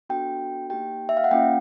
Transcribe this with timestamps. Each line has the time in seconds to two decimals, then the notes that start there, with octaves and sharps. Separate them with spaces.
0.09 B3 D4 F#4 A4 G5
0.70 A#3 D#4 G4 G5
1.09 E5
1.17 F5
1.24 F#5
1.31 A#3 C#4 F4 G5